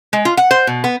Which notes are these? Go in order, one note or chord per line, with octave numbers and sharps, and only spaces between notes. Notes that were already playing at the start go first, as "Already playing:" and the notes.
G#3
F4
F#5
C5
B2
B3